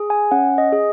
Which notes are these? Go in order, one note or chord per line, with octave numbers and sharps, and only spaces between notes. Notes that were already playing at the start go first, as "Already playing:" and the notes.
Already playing: G#4
G#5
C#4 F#5
D#5
G#4